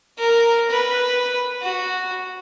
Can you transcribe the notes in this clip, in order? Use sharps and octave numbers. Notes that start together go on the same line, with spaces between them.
A#4
B4
F#4